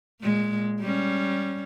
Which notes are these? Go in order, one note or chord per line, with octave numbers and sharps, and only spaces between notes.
A#2 G#3
G3 C#4